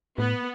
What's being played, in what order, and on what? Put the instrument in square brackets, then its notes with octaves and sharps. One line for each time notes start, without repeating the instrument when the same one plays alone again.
[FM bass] A2 [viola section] B3